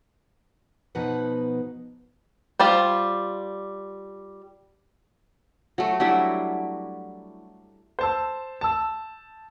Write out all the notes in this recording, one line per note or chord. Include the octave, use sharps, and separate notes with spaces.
B2 F3 D#4 B4 F#5
G3 F4 C5
F#3 A3
F#3 G3 D4 E4
C5 A5 E6
A5 E6